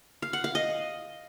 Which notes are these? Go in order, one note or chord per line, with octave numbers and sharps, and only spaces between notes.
F5
F#5
F5
D#5